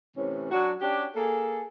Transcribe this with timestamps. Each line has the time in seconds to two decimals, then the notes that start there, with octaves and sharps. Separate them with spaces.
0.17 A2 C3 E3 C#4
0.51 F#3 D4 F#4
0.81 C#4 D4 G4
1.16 A#3 G#4 A4